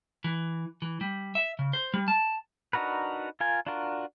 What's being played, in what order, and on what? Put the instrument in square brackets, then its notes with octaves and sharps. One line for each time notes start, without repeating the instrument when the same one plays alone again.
[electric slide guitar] E3
E3
G3
E5
C#3
C5
G3
A5
[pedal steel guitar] D4 D#4 F#4 A#4 B4
F4 A#4 G#5
D4 F4 F#4 A#4